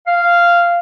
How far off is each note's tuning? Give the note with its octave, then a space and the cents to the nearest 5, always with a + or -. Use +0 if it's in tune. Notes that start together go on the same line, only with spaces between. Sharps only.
F5 -10